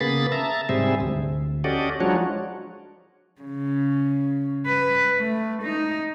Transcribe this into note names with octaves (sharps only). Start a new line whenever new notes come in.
C#3 A#3 B3 G#4 B5 A6
E5 A5 A#5
G#2 C3 G3 C4 G#4 E5
D2
C#4 F#4 G4 A4 D5 D#5
F3 F#3 G#3 D4 F#4 C#5
C#3
B4
A3
D#4